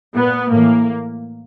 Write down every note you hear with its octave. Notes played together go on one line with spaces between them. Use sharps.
A#2 B3
A2 E3 A#3